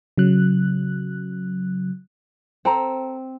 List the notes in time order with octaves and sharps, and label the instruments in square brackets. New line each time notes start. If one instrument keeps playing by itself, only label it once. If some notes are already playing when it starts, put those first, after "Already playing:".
[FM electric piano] C#3 F#3 F#6
[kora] C4 [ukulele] A4 G5 A#5